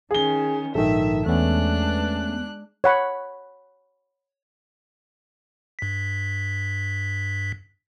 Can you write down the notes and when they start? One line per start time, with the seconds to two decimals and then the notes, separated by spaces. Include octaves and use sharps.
0.11 D#3 C#4 G#4 G7
0.75 A#1 G#2 D#3 A4 E5
1.26 E2 G#3 A3 B3 C#4 D4 F#6
2.84 C#5 F#5 B5
5.79 G2 B6